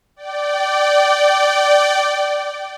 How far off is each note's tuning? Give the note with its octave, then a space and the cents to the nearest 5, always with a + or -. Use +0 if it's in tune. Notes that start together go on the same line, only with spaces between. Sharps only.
D5 +0 G5 -30